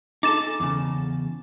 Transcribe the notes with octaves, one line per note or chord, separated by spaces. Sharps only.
D#4 G#4 A4 D6 A6 E7
E2 C#3